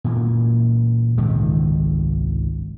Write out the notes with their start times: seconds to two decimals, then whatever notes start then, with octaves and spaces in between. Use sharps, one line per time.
0.04 A#2 E3 A#3
1.18 G#1 C#2 C3 D#3